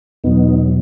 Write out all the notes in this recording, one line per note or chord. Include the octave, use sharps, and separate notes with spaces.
E2 B2 F#3 B3 D#4